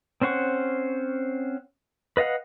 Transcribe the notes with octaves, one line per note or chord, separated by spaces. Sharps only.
C4 C#4 C5 F#5 C#6
B4 D#5 F5 F#5